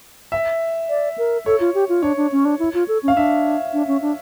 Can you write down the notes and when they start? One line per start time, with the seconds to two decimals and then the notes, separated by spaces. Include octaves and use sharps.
0.32 E5
0.89 D5
1.18 A#4
1.46 A4 C#5
1.60 F4
1.75 G4
1.89 F4
2.02 D4 C#5
2.17 D4
2.32 C#4
2.45 D4
2.59 E4
2.74 F4
2.88 A4
3.03 C#4
3.08 F5
3.16 D4 E5
3.73 D4
3.87 C#4
4.02 D4